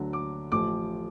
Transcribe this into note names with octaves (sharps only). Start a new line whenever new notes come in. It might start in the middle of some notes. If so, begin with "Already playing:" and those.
Already playing: D2 D3 F#3
D6
A1 A2 F3 D6